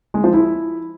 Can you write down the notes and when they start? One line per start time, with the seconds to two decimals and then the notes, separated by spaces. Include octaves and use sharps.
0.14 G#3
0.24 F3
0.33 E4